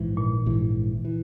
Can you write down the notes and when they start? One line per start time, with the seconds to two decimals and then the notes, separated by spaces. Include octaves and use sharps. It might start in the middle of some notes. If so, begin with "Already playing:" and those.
Already playing: A#1 G#2 E3
0.17 A#2
0.46 A#1 G#2 E3
1.05 E3